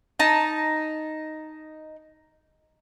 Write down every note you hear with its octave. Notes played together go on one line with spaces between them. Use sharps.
D#4 A5